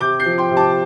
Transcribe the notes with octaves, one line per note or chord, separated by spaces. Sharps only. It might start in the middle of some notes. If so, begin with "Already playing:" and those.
C3 D6 G6
G6 C7
F3
G5 C6
C3
A5 D6